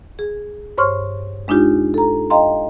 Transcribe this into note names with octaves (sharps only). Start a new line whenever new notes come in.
G#4
G2 C5 C#5 C6 C#6 F6
G#3 D4 D#4 F4 G4
A4 A#5
D#5 F5 G5 A#5 C6